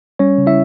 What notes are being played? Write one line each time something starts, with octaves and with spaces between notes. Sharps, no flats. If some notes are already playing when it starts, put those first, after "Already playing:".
G3 C#4 C#5
C#3
E4 E5